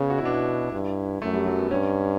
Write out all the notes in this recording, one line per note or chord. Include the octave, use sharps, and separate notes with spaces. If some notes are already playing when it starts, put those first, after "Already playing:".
Already playing: C#3 B3 C#4
F#4
E4
B2 D4
E4
G2
F#2 A3
G3
F#3
B3
G2 C#4